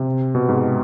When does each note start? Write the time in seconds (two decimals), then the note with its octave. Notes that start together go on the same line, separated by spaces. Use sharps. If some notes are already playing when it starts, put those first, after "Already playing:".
Already playing: C3
0.35 B2
0.49 G#2